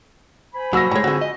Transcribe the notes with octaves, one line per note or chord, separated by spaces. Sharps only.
C5 G#5 B5
C2 F#3 A#3 F#4 C#6 E6 A#6
A2 F3 G#3 C#5 A#5
D3 F3 C4 F#4 G#4
D#5